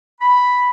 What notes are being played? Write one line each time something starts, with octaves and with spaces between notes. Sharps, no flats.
B5